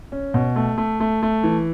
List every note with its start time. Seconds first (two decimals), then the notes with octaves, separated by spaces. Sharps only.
0.12 C#4
0.34 B2
0.56 A3
0.78 A3
1.00 A3
1.23 A3
1.44 E3